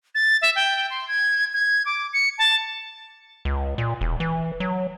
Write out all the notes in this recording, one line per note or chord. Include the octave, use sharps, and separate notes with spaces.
A6
E5
G5
C6
G#6
G#6
D6
C#7
A5
C#2
A#2
E1
E3
F#3